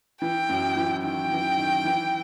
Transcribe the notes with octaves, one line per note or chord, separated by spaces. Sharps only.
E3 G5
F#2 F#3
E3
D#3 G5
E3
D#3
E3